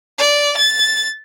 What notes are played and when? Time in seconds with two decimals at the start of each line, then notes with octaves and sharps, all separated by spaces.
0.18 D5
0.58 A6